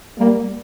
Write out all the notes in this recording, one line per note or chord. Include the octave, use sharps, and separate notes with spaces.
G3 A#3